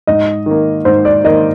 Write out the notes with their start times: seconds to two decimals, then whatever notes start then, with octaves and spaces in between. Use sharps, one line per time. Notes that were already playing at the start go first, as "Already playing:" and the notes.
0.07 G#2 D#5
0.46 D#3 A#3
0.85 G#2 C5
1.05 D5
1.24 D#3 A#3 D#5